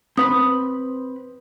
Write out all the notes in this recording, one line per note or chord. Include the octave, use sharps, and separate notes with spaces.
C4 B4 B5 D#6